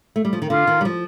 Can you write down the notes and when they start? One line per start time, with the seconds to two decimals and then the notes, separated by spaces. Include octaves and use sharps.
0.16 A3
0.25 G3
0.33 F3
0.42 D#3
0.50 D3 F4
0.67 D#3
0.81 G3
0.85 F3